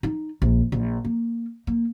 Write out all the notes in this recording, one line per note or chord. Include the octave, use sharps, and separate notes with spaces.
D#4
A#1
A#1
A#3
A#3